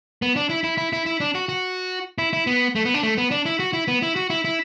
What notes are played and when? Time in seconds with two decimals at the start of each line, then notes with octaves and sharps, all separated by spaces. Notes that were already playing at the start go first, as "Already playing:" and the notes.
0.22 B3
0.36 D4
0.50 E4
0.64 E4
0.78 E4
0.93 E4
1.06 E4
1.20 D4
1.35 F#4
1.49 F#4
2.18 E4
2.33 E4
2.47 B3
2.75 A3
2.85 B3
2.94 D4
3.03 A3
3.18 B3
3.31 D4
3.46 E4
3.60 F#4
3.73 E4
3.88 B3
4.02 E4
4.16 F#4
4.30 E4
4.45 E4